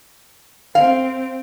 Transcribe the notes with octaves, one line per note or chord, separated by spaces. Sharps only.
C4 F5